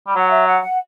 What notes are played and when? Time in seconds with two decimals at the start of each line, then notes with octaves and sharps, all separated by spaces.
0.07 G3
0.16 F#3 F#5
0.30 E5
0.47 F#5
0.62 F#5